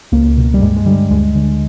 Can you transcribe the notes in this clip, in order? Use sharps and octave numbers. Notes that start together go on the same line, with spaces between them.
C#2 A#3
B2
G3
G2 G#3
G#3
D3 G3
D2 G#3
D3